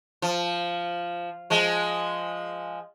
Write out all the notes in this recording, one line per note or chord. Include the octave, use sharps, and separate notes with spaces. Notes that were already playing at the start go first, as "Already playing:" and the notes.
F3
F3 G#3